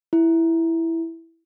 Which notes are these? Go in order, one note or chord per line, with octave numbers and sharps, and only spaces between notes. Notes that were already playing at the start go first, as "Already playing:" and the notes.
E4